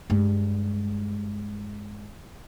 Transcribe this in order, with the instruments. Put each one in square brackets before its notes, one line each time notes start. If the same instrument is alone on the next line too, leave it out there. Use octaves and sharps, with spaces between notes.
[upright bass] G2 G#3